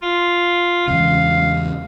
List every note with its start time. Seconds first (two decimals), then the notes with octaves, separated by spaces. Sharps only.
0.03 F4
0.88 E2 G#2 C#3 F5